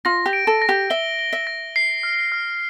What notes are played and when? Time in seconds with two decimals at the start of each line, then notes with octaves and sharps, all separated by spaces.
0.05 F4 A#6
0.26 G4
0.33 D7
0.47 A4
0.62 A#6
0.69 G4
0.90 E5 G7
1.19 G7
1.33 E5
1.47 A#6
1.76 C7
2.03 F6
2.32 F6